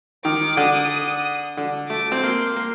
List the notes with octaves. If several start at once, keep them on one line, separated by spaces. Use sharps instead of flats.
D#3 D6
D3 D#6
D3
A3 D6
C4
A#3 C6
A#3